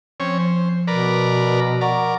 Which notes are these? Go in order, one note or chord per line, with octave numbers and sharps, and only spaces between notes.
F3 C4 C#4 C#5
C5
B2 A#4 B4 D5
A#4 D5 F#5 A#5 C#6